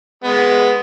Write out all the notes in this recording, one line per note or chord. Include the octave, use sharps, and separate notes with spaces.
G#3 B3